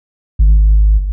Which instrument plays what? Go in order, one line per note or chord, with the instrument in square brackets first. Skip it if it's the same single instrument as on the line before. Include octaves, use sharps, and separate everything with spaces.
[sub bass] G#1